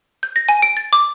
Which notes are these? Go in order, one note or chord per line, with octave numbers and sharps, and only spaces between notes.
G6
A#6
G#5
D7
A6
D6